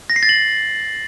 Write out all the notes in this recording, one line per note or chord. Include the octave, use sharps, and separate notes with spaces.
A#6
C7
A6
F#7